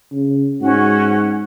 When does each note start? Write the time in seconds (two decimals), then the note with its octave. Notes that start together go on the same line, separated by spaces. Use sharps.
0.12 C#3
0.61 G#2 C#4 F#4 F#5